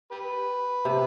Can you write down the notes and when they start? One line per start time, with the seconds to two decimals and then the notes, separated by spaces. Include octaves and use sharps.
0.11 G4 B4
0.85 C3